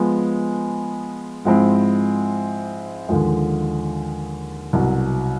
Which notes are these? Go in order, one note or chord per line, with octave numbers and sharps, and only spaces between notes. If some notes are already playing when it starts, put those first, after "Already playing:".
Already playing: F3 G#3 B3
G#2 F3 G#3 C4 E4
D#2 D3 F3 G#3
C2 B2 F#3